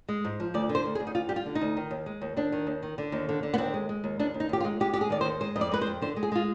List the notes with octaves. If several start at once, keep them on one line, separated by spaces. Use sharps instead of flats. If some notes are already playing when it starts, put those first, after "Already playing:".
G#3
G#2
F3
D2 D5
D3
C5
D2
G#4
D2
D#4
D2 F4
G3 G4
F4
D3
D#4
D2
D#3
D#2
G#3
D#2
D#2 D4
D#3
D#2
D#3
D3
D#2
D3
D3
B3
D#2 C4
G#3
G#3
D#2
D#2 D4
D#2
D#4
D#2 G4
F4
G#3
G#3 G4
G#3 G4
G#4
D#3 D5
C5
D#2
G#3 C5
F2 D#5
D5
G#3 B4
C5
F2
D3 C5
G#3
G#4
G#3 F4